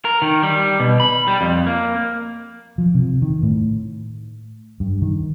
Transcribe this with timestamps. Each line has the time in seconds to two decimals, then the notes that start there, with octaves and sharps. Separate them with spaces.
0.05 A#4
0.22 D#3
0.43 G3
0.80 B2
1.00 B5
1.28 G3
1.41 F2
1.67 A#3
2.78 F3
2.95 C3
3.22 D#3
3.43 A2
4.80 G2
5.02 D#3